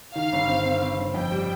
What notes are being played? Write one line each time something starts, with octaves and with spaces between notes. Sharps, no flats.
D#3 F5
G1
C4
C4
C4
G1
F2 G5
G3